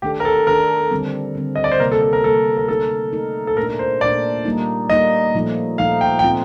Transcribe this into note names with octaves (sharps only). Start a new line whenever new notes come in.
D#3 A3 D4 G4 A4
A#4
A4
D#3 A3 D4 A4 A#4
D3 G3 C4
D3 G3 C4
D#5
D5
C5
C3 G3 A#3 A#4
A4
A4
A#4
C3 G3 A#3 A4
A#4
A3 D#4 A4 A#4
A3 D#4 A#4
A4
A#2 A3 D4 A#4
C5
A#2 A3 D4 D5
G3 A#3 D#4
G3 A#3 D#4 D#5
A#2 F3 A3 D#4
A#2 F3 A3 D#4 F5
G5
G5
A#2 A3 C4 F4